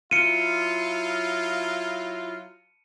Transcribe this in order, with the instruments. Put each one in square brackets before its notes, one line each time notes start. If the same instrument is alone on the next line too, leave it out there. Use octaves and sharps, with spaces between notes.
[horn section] F#3 E4 F4 [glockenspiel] C#7 D#7